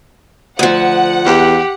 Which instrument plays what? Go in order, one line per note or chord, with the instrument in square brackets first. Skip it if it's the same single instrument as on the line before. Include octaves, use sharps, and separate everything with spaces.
[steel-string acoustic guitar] D2 F3 [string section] F#5
[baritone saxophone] E2 [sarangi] G4